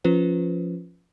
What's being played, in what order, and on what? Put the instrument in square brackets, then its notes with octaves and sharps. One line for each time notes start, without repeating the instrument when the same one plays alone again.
[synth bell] F3 C#4 F4 B4 C5